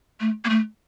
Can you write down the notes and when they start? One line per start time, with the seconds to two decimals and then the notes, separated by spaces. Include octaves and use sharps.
0.20 A3
0.45 A#3
0.50 A3